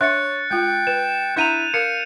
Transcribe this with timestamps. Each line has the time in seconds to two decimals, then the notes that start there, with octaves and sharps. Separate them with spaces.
0.01 D4 C#5 E5 F#5 F#6 A6 C#7
0.51 G#3 F4 G5
0.87 B4 E7
1.36 D4 E4 F#5 A#5 G6 D#7 F7
1.74 A#4 F5 C#7